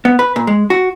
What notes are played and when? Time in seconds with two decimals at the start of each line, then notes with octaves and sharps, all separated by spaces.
0.05 B3
0.19 B4
0.36 A#2
0.47 G#3
0.70 F#4